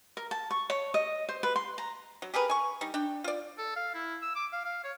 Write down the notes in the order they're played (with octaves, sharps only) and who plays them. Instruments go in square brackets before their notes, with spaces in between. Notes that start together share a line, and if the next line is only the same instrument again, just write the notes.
[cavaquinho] A#4
A5
C#6
C#5
D#5
C5
B4
C6
A#5
[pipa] F#3
G4 G#4 A#4 B4
G#5 C#6
G3 D#4
D4 G5
F4 D5
[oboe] A4
F5
E4
E6
D6
F5
F5
C#5